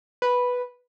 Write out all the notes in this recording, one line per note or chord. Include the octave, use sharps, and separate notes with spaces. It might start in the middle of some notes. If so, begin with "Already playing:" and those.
B4